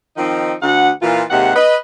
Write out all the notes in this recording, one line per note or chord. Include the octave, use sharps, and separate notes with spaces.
D#3 F3 C4 D#4
D2 F#5
A#2 E3 F4
D#2 C3 G#3 F#5
B4 D#5